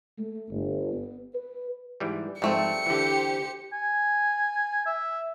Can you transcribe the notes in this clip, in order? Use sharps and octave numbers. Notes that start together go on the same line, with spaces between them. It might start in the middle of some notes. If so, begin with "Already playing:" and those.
A3
G1
B3
B4
G#2 E3 G3
G#2 F3 G3 A3 C4 C#7
D3 E3 G4 C5
G#5
E5